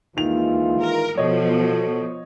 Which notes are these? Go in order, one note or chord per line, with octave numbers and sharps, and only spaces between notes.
D#2 D#3 E3 G#3 F4 F7
A#4
B2 F3 F#4 A4 C#5 D#5